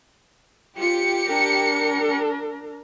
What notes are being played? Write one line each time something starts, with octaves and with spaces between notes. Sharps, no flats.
F4 G4 C#7
D4 A#4